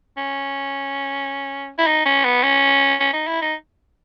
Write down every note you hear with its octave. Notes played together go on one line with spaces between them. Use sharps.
C#4
E4
D#4
C#4
B3
C#4
C#4
D#4
E4
D#4